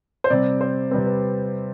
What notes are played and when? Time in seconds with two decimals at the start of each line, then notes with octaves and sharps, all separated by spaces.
0.24 C5
0.30 C3 G3 C4 D5
0.61 C5
0.91 C3 G3 C4 B4
1.06 B4